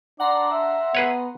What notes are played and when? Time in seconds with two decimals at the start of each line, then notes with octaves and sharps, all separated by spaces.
0.20 D4 D5 F#5 A#5 C6
0.51 E5
0.95 B3 G#4 B4 C#5